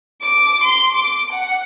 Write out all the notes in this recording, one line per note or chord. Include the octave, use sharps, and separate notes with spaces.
D6
C6
D6
F#5